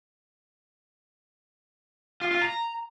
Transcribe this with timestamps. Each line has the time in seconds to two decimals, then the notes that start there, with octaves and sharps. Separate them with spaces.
2.21 F4
2.31 F4
2.42 A#5